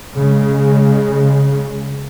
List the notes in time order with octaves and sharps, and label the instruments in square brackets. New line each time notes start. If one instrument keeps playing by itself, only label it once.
[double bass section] C#3 G#3